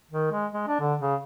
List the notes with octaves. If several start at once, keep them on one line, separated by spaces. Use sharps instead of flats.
D#3
G#3
G#3
D4
D3
C#3